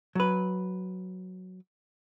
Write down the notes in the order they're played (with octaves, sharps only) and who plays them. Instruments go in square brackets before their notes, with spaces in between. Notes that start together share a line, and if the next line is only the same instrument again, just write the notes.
[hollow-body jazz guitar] F#3 B4